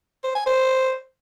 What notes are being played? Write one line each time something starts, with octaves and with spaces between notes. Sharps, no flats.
C5
G#5
C5